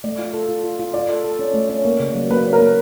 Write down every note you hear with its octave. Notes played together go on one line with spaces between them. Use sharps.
A3 D5
F4
A4
F4
F4
F4
F4 D5
A4
A4
C#4
A3
C#4
A#3
C#3
F#3
A#3 B4
C#4
A#4
A#3